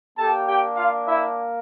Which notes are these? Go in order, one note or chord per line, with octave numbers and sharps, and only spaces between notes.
A#3 D4 G4 A4 A5
G4 G5
F4 F5
E4 E5